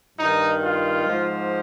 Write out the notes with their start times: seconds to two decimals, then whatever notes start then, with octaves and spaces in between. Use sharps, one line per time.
0.19 G2 D#3 D#4
0.62 F4
1.07 G#2 F3